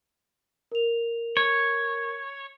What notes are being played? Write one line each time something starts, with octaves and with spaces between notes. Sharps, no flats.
A#4 F7
C#5